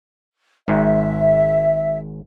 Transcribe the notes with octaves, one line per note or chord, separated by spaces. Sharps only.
G#1 G#2 E5